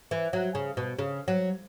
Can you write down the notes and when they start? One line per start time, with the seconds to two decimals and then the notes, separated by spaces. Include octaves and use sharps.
0.11 E3
0.33 F#3
0.55 C#3
0.77 B2
0.99 C#3
1.28 F#3